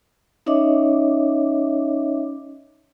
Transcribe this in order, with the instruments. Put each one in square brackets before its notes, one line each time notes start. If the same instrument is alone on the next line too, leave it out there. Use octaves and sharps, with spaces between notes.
[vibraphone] C#4 D#4 C#5 D#5 E5 D6